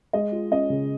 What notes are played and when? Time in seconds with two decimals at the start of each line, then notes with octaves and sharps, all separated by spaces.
0.13 G#3 D#5
0.32 F4
0.51 C#4 D#5
0.70 C#3